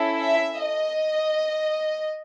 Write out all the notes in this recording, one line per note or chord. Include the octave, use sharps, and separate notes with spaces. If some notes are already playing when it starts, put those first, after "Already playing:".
Already playing: C#4 E4 A4
E5
D#5